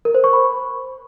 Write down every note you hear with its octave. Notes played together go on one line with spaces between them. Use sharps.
A#4
C5
C#6
B5